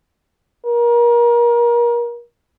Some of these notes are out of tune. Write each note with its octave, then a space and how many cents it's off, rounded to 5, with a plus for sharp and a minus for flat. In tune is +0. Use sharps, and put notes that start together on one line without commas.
A#4 +30